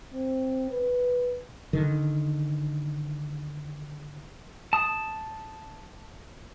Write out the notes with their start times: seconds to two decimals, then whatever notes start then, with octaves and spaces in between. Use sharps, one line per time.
0.14 C4
0.71 B4
1.73 D3 D#3
4.73 A5 D#6